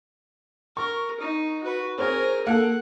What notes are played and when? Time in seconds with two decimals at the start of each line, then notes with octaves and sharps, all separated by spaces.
0.77 A#4 C#6
1.20 D#4
1.63 F#4 B4
1.98 C4 G#4 A#4 C#5
2.47 A#3 A4 F#5